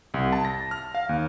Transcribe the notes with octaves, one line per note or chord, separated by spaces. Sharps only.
C2
A5
A#6
F6
F5
D#2